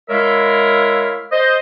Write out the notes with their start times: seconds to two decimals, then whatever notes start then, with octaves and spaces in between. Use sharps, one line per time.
0.10 G#3 E4 A#4 C#5 E5 F5
1.32 C5 D#5